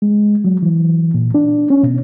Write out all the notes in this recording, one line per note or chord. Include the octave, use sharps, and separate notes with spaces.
G#3
F#3
E3
A#2
D4
C#4
B2